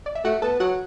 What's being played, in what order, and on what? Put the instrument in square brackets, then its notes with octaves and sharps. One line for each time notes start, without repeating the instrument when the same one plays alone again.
[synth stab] D5
E5
[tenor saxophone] A3 [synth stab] F#4 F#5
[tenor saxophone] B3 [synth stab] A4 A5
[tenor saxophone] F#3 [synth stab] F#4 F#5